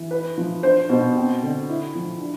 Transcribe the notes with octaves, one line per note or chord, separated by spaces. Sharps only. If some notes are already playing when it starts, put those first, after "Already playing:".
Already playing: E3
E4 B4
F3
D4 C5
B2
C4
D3
E4
F3
D4